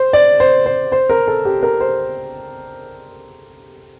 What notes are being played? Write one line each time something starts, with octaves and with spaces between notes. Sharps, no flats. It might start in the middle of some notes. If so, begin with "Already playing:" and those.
Already playing: C5
D5
C5
C5
C5
A#4
A4
G4
A#4
C5